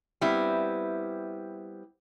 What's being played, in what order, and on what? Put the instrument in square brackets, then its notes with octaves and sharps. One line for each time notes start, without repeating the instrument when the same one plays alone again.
[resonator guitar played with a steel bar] G3 B3 C4 E4